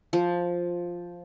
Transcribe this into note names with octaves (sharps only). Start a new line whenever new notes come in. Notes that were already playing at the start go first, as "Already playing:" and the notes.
F3